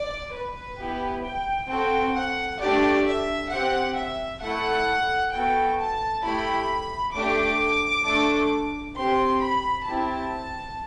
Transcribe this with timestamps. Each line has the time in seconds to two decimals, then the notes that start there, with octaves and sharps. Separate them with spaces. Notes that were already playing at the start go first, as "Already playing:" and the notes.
Already playing: D5
0.33 B4
0.78 B3 E4 G4
1.24 G5
1.69 C4 F#4 A4 G5
2.14 F#5
2.60 A3 D4 G4 D5
3.06 E5
3.51 C4 G4 F#5
3.96 E5
4.42 A3 E4 A4 F#5
5.32 B3 F#4 A4 G5
5.78 A5
6.23 A3 E4 G4 B5
7.14 A3 D4 G4 D6
8.05 A3 D4 A4
8.96 C4 G4 C6
9.41 B5
9.86 C4 E4 G4 A5